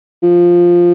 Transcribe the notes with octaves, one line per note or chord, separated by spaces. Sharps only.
F3